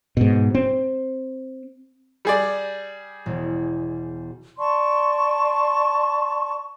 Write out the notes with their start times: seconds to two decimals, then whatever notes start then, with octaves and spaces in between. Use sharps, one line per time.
0.17 G#2 B2
0.55 C4
2.25 G3 G#4 D5
3.26 E1
4.58 D5 A5 C6 C#6